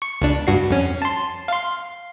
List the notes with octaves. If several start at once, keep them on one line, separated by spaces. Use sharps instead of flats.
C#6
C#2 D4
G2 F#4 C7
F2 C#4
A5 C6
F5 C6